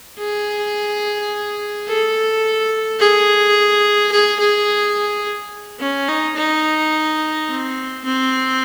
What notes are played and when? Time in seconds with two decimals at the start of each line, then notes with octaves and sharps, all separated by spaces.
0.19 G#4
1.88 A4
3.00 G#4
4.12 G#4
4.40 G#4
5.80 C#4
6.08 D#4
6.36 D#4
7.49 C4
8.05 C4